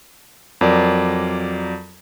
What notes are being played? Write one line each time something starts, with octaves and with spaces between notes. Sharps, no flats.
F2 F#3 A#4 D5